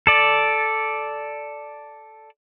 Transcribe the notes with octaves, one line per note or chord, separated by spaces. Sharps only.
A4 D5